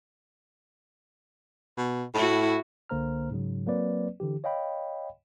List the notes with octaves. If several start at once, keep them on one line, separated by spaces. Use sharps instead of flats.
B2
A2 E4 F#4
C2 D3 A#3 C5 A#5 F6
G#2 C#3 F#3
F#3 A#3 C4 B4 D5
D3 E3 G4
C#5 D#5 F5 G5 B5